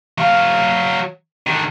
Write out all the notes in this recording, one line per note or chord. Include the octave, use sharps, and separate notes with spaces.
F#3 F5
D#3 D4